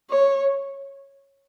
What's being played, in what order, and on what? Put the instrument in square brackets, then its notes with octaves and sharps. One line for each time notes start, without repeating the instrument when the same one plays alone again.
[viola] C#5